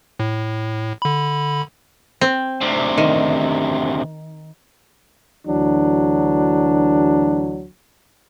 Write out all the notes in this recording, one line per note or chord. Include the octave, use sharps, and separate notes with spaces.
A2
D3 B5
C4
D2 C3
D#3
D2 E3 F#3 D4